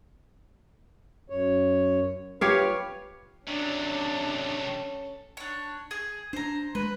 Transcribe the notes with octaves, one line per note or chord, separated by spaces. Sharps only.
F#2 C#5
F4 G4 B4 C#5 F5
C3 F#3 C#4 D4 A4
D4 C#5
G#4
D4 C5 A#5
G#3 B4